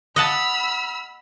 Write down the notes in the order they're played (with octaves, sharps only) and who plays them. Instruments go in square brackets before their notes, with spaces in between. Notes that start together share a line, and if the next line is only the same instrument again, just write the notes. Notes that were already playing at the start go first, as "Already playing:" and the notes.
[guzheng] D#5 F#5 A5 [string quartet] B5 E6 F6